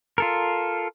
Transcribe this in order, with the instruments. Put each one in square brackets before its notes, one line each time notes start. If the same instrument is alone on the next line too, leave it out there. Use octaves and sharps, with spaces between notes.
[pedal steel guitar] F4 A4 A#4